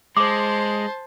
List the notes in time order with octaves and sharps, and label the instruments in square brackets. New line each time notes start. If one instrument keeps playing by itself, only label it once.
[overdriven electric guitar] G#3 [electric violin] C5 A5 [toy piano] D6